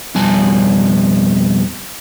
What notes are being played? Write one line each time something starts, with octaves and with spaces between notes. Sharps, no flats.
F2 B2 G3 G#5 A5